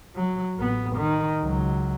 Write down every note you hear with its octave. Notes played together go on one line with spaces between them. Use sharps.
F#3
A1 B3
D#3
C#2 F#3